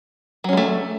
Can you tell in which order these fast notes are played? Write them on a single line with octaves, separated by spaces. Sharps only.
F#3 C#4 G#3 A3